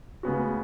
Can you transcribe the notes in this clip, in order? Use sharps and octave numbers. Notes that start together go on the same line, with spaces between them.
D2 C#3 G#3 B3 F#4